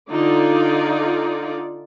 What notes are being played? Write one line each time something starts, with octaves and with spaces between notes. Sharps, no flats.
D3 D#4 F4 D5